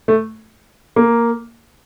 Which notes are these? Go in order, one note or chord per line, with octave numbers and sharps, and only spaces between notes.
A3
A#3